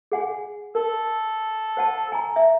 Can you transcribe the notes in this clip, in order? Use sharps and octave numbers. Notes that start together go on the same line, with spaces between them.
G#4 F#5 G#5
A4 A#4
C5 F#5 A5
G#5 A#5
E5